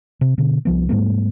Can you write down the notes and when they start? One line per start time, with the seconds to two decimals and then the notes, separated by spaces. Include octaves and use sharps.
0.21 C3
0.38 B2 D3
0.65 C2 F3 B3
0.89 G#2 G3 A3 B3